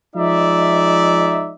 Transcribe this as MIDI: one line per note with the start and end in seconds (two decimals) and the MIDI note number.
0.16 1.54 53
0.16 1.54 56
0.16 1.54 63
0.16 1.54 74
0.16 1.54 76